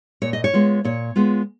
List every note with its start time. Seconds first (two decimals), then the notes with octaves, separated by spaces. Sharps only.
0.22 A#2 C#5
0.33 D#5
0.44 C#5
0.53 G#3 B3 F4
0.85 A#2 C#5
1.16 G#3 B3 F4